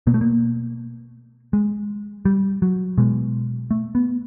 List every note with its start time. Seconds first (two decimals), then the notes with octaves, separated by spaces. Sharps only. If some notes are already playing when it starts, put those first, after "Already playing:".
0.07 B2 A#3
0.14 A3
0.21 A#3
1.53 G#3
2.25 G3
2.62 F#3
2.98 B2 G#3
3.71 A3
3.95 B3